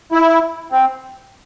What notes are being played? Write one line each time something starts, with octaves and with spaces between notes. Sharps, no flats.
E4
C4